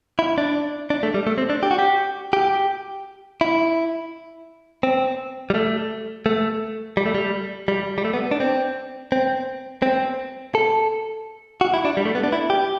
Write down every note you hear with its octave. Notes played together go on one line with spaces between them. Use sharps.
E4
D4
D4
A3
G3
A3
C4
D4
G4
F#4
G4
G4
E4
C4
G3
A3
A3
G3
A3
G3
G3
G3
A3
B3
D4
C4
C4
C4
A4
F#4
E4
D4
G3
A3
B3
D4
E4
G4